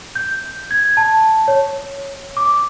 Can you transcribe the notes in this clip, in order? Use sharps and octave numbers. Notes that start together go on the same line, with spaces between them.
G6
G#6
A5
C#5
D6